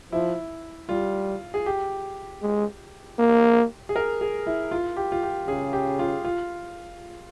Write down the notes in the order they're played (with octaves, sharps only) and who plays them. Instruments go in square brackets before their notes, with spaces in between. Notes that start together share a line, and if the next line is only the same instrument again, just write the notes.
[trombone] F3 [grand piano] E4
[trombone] G3 [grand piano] F4
[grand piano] G#4
G4
[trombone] G#3
A#3
[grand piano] G#4
A#4
G#4
E4
F4
G4
F4
G4
[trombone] C#3 [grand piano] G#4
[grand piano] G4
F4
F4